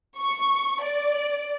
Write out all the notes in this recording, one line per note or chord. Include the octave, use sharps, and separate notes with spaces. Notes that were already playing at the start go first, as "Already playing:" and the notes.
C#6
D5